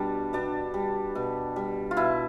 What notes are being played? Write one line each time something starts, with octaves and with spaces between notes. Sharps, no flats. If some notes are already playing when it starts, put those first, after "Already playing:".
Already playing: B2 G3 D4
B2 D4
G3
B2
G3
F4
B2 E4